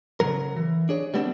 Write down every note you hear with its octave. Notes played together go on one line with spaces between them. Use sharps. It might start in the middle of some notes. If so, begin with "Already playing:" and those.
C#3 F#3 A#4
E3
D4 G#4 C#5
G3 A3 B3 C4 D4